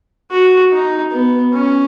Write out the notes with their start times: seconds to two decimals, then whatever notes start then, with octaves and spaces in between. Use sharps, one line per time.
0.31 F#4
0.72 D#4
1.12 B3
1.53 C#4